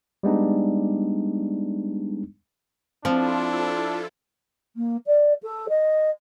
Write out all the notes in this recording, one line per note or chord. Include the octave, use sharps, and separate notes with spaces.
G3 G#3 B3 D4 D#4
F3 C4 D4 E4 F4 A4
A#3
D5
A4
D#5